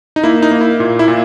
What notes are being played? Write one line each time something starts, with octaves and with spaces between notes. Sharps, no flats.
D#4
A#3 E4
D#4
A#3
E4
A#2
E4
A#2